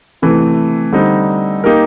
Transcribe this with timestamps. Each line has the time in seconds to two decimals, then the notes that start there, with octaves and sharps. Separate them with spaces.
0.22 C3 E3 A3
0.92 D3 G3 C4 D#4
1.64 A#3 D#4 G4 A#4